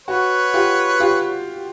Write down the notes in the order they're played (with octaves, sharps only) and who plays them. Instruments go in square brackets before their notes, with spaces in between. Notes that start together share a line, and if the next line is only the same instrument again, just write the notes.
[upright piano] F#4 [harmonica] B4 C#5
[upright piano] F4 G4
F4 G4